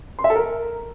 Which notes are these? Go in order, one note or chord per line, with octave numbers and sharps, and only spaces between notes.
C6
E5
A4
A#4